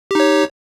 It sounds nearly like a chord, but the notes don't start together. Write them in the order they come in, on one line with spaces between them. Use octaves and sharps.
G4 D#4 C#5